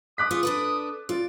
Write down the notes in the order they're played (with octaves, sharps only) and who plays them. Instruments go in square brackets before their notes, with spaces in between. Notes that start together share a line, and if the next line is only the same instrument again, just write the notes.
[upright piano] D6 F#6 B6 [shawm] D#6
[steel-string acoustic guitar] F4 G#4 C#5
D4 A4 B4
[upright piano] F4 [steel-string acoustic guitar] D5